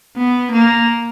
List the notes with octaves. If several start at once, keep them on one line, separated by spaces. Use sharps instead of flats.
B3
A#3